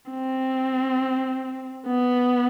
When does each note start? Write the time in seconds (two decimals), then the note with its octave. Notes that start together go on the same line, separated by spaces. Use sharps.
0.11 C4
1.87 B3